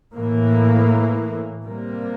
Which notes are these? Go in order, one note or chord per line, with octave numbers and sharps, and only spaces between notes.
A2 E3 A#3
C3 G3 A#3